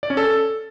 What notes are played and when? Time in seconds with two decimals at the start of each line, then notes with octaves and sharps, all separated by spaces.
0.03 D5
0.10 C#4
0.17 A4